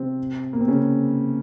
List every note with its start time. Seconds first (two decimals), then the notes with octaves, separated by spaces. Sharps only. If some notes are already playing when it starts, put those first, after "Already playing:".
Already playing: C3 C4
0.53 A#3
0.60 C4
0.68 C#3 C#4